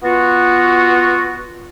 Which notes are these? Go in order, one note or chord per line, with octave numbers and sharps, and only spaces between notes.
B3 F4 F#4